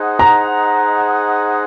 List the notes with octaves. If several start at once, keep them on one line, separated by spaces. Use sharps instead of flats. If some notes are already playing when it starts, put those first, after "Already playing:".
Already playing: D#4 G#4 C5 D#5 F#5
A#5